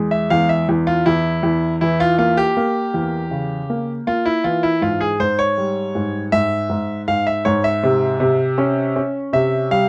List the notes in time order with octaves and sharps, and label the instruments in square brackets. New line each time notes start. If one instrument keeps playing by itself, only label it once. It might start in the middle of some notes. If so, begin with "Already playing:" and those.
Already playing: [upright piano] E2 G#3
[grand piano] E5
[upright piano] E2 [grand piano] F5
[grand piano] E5
[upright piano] E2
[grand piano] F4
[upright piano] E2 [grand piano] E4
[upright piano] E2
[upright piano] E3 [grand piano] E4
[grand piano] F4
[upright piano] A#3 [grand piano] F4
[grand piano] G4
[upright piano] A#3
E2
C#3
A#3
[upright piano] A#3 [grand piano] F4
[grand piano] E4
[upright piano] E3 [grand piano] F4
[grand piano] E4
[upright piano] G#2 [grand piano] F4
[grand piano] G#4
[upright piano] G#2 [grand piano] C5
[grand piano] C#5
[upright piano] G3
G#2
[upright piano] G#2 [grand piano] E5
[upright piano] G#2
[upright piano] G#2 [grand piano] F5
[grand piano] E5
[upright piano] G#2 [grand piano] C#5
[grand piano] E5
[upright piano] C3
C3
C#4
C#4
[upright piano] C3 [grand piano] E5
[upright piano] G3 [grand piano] F5